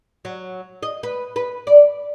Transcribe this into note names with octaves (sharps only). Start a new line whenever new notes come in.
F#3
D#5
B4
B4
D5